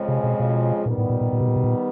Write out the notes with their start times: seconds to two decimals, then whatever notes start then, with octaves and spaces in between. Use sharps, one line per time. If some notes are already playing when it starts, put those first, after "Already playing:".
Already playing: F2 C#3 F3 G#3
0.08 C3
0.24 B2
0.40 B2
0.86 A#2 D#3 G3 B3
0.98 A2
1.09 A#2
1.21 A#2
1.33 A#2
1.41 B2
1.48 A#2
1.56 B2
1.64 A#2